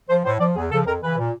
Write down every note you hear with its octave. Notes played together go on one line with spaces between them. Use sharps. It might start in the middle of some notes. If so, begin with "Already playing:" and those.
F3 C5
A2 C5
F3 D5
E2 G#4
C#3 F3 A4
F2 A#4
C#3 E3 B4
A#2